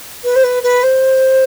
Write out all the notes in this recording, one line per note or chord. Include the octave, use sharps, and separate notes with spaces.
B4
C5
B4
B4
C5